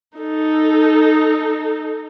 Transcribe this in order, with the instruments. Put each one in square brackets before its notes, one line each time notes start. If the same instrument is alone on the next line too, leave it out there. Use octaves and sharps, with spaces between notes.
[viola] D#4 A4